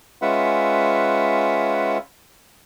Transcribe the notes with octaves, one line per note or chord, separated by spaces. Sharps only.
G#3 C#4 F4 B4 E5 F#5